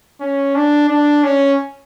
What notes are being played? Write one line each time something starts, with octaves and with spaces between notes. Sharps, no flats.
C#4
D4
D4
C#4